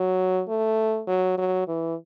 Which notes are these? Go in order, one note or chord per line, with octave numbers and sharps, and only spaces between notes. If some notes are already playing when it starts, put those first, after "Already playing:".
Already playing: F#3
A3
F#3
F#3
E3